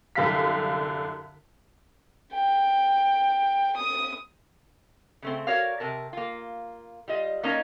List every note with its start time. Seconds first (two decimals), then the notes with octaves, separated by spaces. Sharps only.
0.15 C2 F#2 D3 F5 B6
2.34 G5
3.77 D#6
5.22 C#3 A3 C4
5.47 F#4 A#4 C#5 D5 F5
5.80 C3 A#4 A5
6.13 A#3 F4
7.08 G3 F4 D#5
7.43 A#3 C#4 D#4 A#4 D#5 A#5